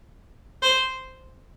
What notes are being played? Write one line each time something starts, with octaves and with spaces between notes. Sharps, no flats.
C5